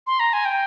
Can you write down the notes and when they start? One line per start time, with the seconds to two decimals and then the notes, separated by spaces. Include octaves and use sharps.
0.07 C6
0.20 A#5
0.33 G#5
0.45 G5